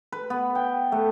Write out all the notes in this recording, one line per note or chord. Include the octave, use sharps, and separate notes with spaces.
B4
B3
G5
A3